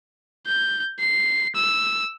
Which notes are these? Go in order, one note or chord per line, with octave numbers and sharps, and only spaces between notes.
G6
C7
E6